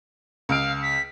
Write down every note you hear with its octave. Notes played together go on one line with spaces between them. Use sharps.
C#2 F5 D7
B6